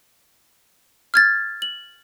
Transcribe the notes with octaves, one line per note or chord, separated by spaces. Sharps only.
F6 G#6 A6
F#7